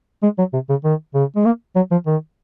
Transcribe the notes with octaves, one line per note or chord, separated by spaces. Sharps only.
G#3
F#3
C3
C#3
D#3
C#3
G#3
A#3
F#3
F3
D#3